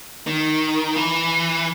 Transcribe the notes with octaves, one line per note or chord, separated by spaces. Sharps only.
D#3
E3